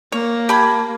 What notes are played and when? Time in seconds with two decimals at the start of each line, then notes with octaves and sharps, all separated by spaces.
0.12 A#3 C#5
0.49 G4 A5 B5 G#6